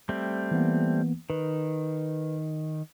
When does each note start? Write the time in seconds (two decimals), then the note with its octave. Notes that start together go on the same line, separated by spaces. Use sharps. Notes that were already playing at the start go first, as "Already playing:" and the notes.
0.09 G3 A3 C4
0.51 E3 A#3 B3
1.30 D#3 B4